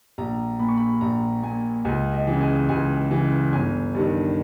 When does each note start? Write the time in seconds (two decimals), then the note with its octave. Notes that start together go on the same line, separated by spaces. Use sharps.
0.18 A#1 A#5
0.59 A#2 B5
0.68 C#6
0.77 B5
1.01 A#1 A#5
1.43 A#2 G#5
1.85 C#2 G#5
2.13 D#5
2.27 C#3 E3
2.41 G#5
2.69 C#2 G#5
3.11 C#3 E3
3.53 G1 G#5
3.95 G2 D#3